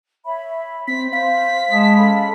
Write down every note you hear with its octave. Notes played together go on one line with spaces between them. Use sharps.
C#5 E5 B5
C4 C5 B6
C5 F5 B6
G#3 A5 D#6
C#4 A4 B5